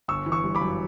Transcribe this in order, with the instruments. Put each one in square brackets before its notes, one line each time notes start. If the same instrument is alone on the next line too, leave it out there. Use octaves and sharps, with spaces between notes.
[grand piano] G1 C#6 E6
E3
C#6 E6
G3
B5 D6
F#2